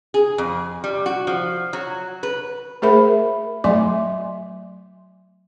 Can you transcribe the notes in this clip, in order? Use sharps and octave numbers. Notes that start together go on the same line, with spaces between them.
G#4
F2
G3
F#4
F3
F#3
B4
A3 G#4 A#4 C5 E5 B5
F#3 A3 D#5 E5 G#5 C6